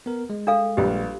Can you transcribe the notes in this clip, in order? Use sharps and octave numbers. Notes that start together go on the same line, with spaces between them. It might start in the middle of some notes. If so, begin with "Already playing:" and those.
B3 A#4
G#3
D4 A4 F5
A#1 G3 G4 B4